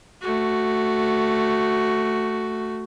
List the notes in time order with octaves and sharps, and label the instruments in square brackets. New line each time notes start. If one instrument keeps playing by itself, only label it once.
[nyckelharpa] A3 F#4